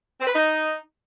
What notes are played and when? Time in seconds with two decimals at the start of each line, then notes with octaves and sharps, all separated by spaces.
0.20 C4
0.27 B4
0.34 D#4